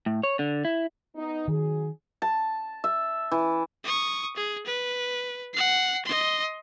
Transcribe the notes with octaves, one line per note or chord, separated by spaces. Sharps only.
A2
C#5
D3
E4
B3 D#4
D#3 F#3 G#4
A5
E5
E3
C#6 D#6
G#4
B4
F#5 C7
D#5 C6